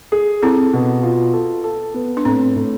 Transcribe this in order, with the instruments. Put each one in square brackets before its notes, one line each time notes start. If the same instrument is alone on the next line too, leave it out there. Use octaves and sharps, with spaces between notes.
[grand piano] G#4
[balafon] C4 E4 [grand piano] A4
[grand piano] B2
F4
A4
A4
B3
[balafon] D4
[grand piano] A2 [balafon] C4
[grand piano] A2